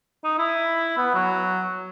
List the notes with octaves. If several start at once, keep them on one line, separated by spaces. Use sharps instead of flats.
D#4
E4
B3
F#3